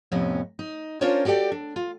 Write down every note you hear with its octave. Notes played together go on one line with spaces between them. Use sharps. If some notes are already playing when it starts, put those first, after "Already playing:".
F2 A2 C3 B3 C#4
D#4
C#4 D4 F4 A#4 C5 C#5
F#4 G4 A4 D5 G5
D4
F4